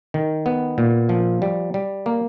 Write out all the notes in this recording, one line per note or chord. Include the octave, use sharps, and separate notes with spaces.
D#3
B3
A#2
F3
G3
G3
A#3